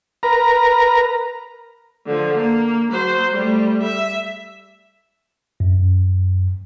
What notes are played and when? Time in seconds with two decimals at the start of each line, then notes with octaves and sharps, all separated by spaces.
0.23 A#4 B4 A#5
2.06 D3 F3
2.37 A#3
2.90 F#3 C5
3.32 G3 A3
3.82 E5
5.60 F#2